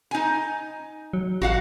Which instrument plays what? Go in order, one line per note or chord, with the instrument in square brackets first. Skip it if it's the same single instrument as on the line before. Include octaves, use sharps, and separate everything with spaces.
[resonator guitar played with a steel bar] D#4 G#5
[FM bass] F#3
[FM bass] A1 [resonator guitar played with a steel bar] F#4 F5 F#5